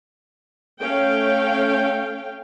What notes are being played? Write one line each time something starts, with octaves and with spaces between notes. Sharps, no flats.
A3 C#4 F5 G5